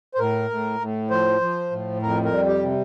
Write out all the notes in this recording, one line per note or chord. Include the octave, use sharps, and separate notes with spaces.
C5
A2 A#4
A2
A2
F3 C5
F3
A2
F2 A#4
A#4
G3
G4
C3